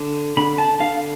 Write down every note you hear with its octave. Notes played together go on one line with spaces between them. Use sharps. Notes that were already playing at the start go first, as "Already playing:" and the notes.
Already playing: D3
D3 B5
A5
D3 F5